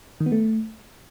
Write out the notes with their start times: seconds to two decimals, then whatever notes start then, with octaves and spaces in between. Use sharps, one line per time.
0.20 D#3
0.26 B3
0.32 A3